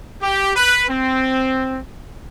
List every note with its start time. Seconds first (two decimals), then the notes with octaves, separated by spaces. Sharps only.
0.23 G4
0.56 B4
0.90 C4